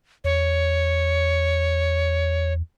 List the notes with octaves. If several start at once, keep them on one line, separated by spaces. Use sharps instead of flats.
E2 C#5